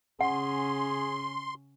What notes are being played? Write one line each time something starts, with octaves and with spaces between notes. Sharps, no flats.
C#3 C#4 G#4 F#5 C6